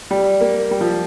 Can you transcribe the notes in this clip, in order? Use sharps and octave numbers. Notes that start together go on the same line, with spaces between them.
G3
A#3
G3
F3